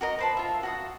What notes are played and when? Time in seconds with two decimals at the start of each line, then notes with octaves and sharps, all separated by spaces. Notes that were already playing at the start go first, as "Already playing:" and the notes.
0.01 F#4 A#4 D#5
0.19 B4 C5 A5
0.37 F4 E5
0.63 F#4 F#5 D#6